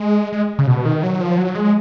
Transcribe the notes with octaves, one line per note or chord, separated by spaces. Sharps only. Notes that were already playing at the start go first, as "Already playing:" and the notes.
Already playing: G#3
G#3
C#3
B2
D#3
F#3
F3
F#3
G#3